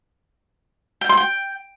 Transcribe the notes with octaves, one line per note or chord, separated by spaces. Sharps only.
G5
C6
G5